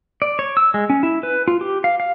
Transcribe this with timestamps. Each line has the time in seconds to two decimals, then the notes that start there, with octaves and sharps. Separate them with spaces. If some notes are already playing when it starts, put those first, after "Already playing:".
0.22 D5
0.39 C#5
0.57 E6
0.74 G#3
0.90 C#4
1.03 E4
1.23 B4
1.48 F4
1.61 G4
1.84 F5
2.00 F5